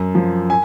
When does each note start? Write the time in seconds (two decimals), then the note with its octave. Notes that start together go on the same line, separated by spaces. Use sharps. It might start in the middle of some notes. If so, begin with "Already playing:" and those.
Already playing: F#2
0.15 F3
0.50 G#5